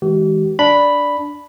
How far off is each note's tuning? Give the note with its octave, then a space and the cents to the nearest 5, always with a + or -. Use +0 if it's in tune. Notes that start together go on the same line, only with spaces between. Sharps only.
E3 -30 G#3 +0 G4 -45
D4 -5 B5 +0